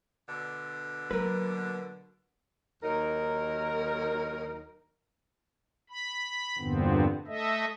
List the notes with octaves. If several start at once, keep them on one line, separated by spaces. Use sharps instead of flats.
B2 D3
F#3 A#3 A#4 B4
D#2 F#3 D#4 A#4
B5
E2 G2 A#2 D3 B3 C4
A3 A4 D#5 E5